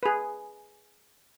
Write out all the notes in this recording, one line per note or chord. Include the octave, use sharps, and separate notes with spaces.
G#4 B4